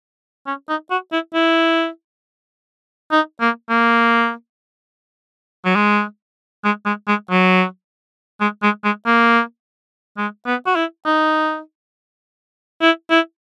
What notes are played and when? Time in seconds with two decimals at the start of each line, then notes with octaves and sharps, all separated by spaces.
0.47 C#4
0.69 D#4
0.91 F#4
1.12 E4
1.34 E4
3.11 D#4
3.41 A#3
3.69 A#3
5.65 F#3
5.76 G#3
6.65 G#3
6.86 G#3
7.08 G#3
7.31 F#3
8.41 G#3
8.63 G#3
8.84 G#3
9.07 A#3
10.17 G#3
10.46 B3
10.66 F#4
10.76 E4
11.06 D#4
12.81 E4
13.11 E4